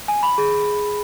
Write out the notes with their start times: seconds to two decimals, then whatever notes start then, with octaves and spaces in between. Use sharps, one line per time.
0.08 G#5
0.23 B5
0.38 G#4